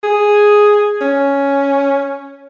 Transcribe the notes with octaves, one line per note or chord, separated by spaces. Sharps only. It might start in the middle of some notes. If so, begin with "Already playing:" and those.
G#4
C#4